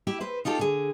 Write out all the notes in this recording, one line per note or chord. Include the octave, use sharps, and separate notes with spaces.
E4 G4 E5
B4 C5
D#4 F4 G4 A4
D3 G#4